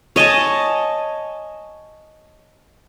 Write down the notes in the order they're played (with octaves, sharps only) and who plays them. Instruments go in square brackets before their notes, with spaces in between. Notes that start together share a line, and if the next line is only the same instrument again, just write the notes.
[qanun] C#5 D#5 G#5 A5